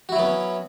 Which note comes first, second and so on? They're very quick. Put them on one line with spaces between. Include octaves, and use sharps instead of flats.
F#4 E4 F#3 B3 C#4